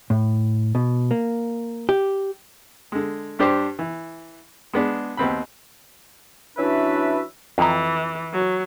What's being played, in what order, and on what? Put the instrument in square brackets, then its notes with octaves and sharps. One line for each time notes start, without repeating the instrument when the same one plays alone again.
[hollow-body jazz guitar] A2
B2
A#3
G4
[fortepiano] D3 G#3
G2 D4 G4 C5 D6
E3
G#3 B3 D4
D#2 B3 C4 B5
[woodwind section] E3 C#4 D4 F#4 B4 E5
[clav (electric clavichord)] F2 A#5 [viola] E3
[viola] F#3